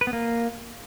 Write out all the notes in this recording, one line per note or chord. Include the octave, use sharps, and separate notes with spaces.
B4
B3
A#3